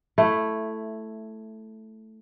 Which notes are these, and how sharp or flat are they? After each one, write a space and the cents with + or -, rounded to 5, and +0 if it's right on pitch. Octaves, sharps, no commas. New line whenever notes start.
A3 +0 E4 +10